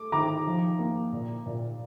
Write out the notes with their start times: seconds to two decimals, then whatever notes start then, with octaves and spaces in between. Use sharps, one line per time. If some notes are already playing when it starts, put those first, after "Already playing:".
Already playing: A3 D6
0.12 D#3 A#5 D6
0.46 F3
0.79 A#3
1.13 A#2
1.46 A#2